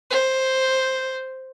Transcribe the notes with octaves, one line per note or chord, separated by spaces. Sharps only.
C5